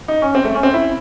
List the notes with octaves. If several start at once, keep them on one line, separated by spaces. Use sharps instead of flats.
D#4
C#4
C4
A3
C#4
C4
E4